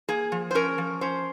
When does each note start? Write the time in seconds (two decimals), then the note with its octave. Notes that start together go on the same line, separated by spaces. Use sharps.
0.09 A#3 G#4
0.32 F3
0.51 C5
0.55 C#4 A#4
0.78 F3
1.01 C#4 C5